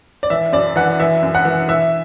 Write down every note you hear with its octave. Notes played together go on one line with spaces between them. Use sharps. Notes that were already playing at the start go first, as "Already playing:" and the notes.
D5
E3 E5
F#2 D5
E3 F#5
E3 E5
F#2
F#5
E3
E3 E5